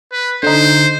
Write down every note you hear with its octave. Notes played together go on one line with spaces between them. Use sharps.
B4
D3 D#4 C5